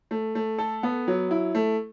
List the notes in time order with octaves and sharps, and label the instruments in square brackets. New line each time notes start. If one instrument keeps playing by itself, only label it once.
[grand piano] A3
A3
A4
B3
F#3
E4
A3